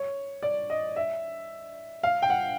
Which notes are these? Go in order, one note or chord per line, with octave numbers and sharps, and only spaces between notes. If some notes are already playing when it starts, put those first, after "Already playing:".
Already playing: C#5
D5
D#5
E5
F5
G5
F#5